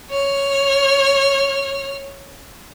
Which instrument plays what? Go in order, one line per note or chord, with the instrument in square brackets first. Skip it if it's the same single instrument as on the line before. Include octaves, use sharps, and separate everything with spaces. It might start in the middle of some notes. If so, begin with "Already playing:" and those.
[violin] C#5 F6